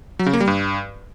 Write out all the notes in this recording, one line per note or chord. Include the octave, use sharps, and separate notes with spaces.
F#3
C#3
A#3
G3
G2